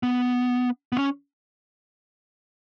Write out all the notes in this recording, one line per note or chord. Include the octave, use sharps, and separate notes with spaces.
B3
B3
C#4